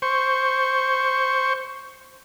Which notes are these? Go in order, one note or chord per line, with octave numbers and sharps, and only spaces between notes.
C5 C#6